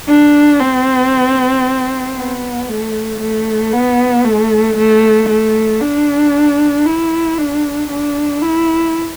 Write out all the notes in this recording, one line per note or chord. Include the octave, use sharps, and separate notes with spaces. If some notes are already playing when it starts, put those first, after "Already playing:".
D4
C4
B3
A3
A3
B3
A3
A3
A3
D4
E4
D4
D4
E4